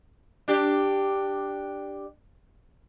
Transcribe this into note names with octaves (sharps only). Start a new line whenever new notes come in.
D4 G4